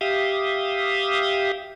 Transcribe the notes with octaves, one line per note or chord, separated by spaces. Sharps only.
G4 E5 F5 D#6